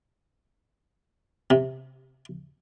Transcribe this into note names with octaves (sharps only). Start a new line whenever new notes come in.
C3